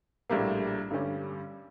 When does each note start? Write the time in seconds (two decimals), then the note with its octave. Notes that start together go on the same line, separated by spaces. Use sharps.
0.30 A#1 A2 G3 A#3
0.90 G2 D3 G3 C#4